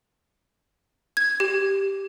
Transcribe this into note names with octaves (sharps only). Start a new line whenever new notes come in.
G#6
G4